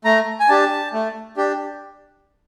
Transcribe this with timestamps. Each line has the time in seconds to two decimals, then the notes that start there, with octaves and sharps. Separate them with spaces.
0.05 A3 A#5
0.40 G#5
0.49 D4 G4 A5
0.93 A3
1.37 D4 G4